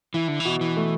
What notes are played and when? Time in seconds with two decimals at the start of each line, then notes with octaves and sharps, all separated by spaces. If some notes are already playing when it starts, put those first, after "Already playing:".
0.14 E3 E4
0.28 D3
0.40 E3
0.45 B2
0.61 E3
0.77 A3